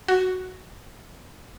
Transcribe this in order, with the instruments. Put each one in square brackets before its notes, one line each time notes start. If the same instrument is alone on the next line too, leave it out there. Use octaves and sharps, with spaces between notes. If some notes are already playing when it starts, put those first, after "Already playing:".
[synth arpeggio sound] F#4